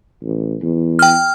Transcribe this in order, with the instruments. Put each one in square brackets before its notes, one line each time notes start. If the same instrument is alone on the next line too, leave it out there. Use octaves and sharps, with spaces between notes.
[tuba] A1
E2
[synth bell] G5 F6